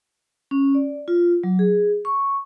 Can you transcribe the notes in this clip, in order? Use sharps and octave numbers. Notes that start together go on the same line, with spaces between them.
C#4
D5
F4
F#3
G#4
C#6